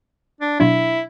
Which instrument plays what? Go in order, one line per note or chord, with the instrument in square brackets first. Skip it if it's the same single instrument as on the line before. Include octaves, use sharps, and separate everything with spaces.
[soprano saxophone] D4
[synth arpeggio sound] B2 F#3 D4 [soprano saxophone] E4